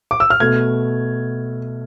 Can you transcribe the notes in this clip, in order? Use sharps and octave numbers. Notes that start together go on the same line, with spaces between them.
D6
E6
F6
B2 A3 G#6